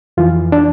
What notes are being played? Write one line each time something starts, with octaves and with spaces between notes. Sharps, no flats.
F2 E3 F4
D4